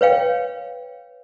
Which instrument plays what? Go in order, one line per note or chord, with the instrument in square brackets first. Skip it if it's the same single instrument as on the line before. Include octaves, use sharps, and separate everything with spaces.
[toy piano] B4 C#5 F5 G5